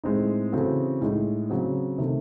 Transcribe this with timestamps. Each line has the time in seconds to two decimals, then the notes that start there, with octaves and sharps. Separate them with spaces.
0.04 A2 G#3 C4 D#4
0.52 C#3 E3 C4 F#4 A4
1.01 A2 G#3 D#4
1.50 C#3 F#3 C4
1.98 C3 D#3 A3